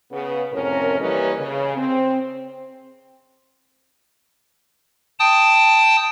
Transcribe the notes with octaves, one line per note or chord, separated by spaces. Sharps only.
C#3 B3
F2 A2 C3 C#4 A#4
E3 G3 A#3 C#4 B4 D#5
C#3
C4
G5 A5 D#6